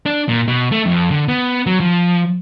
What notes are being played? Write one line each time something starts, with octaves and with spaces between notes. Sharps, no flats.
D4
A#2
B2
A3
F2
D3
B3
F#3
F3